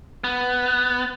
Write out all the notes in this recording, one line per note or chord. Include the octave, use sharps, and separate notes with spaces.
B3